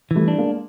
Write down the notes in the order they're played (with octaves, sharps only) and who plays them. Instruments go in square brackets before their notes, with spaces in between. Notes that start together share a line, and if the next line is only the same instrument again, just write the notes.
[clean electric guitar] E3 [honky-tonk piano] G3 A3
[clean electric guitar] D4
[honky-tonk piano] G#3 A#3